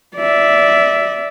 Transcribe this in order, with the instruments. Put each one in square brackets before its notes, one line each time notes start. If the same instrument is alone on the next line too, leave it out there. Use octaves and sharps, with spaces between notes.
[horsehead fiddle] D5 E5